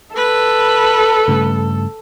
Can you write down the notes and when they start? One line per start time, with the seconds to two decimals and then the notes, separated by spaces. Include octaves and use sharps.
0.16 A4 B4
1.28 G2 C#3 A3